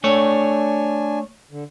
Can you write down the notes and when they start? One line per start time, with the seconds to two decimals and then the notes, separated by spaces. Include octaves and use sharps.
0.04 A3 D4 C#5 G#5
1.51 D3